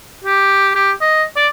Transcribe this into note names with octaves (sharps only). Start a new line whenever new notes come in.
G4
G4
D#5
D5